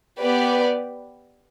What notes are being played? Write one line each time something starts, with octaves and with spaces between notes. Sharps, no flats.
B3 G4 B4 D5